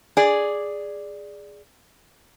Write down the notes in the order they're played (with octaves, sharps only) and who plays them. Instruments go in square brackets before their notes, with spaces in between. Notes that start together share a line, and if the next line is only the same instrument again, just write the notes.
[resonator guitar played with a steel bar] G#4 D5